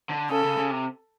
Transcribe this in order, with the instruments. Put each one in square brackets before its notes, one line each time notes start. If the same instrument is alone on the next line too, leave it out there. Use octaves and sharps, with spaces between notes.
[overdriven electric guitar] D3
[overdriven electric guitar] C#3 [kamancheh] A4
[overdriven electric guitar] C#3
C#3
C3